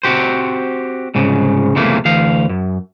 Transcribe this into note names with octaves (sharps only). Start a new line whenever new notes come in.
C4 F#4 G4 C5
C2 G#2 C#3
C#2 F#2 C3 E3 A3 A#3
D2 E3 F5
F#2